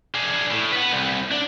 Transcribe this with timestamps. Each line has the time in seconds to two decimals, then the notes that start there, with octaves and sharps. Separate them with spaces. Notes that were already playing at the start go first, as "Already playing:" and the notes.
0.15 D4 G#4
0.51 A2
0.72 B4 F#5
0.92 C2
1.31 D4